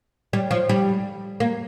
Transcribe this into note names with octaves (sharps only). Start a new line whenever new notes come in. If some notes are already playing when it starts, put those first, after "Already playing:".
G3
F3
G3
A#3